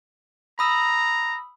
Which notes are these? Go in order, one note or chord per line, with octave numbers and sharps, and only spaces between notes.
A#5 B5 D#6 E6